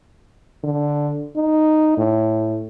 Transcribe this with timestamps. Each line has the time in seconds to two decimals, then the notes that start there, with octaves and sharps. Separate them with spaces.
0.64 D3
1.36 D#4
1.97 A2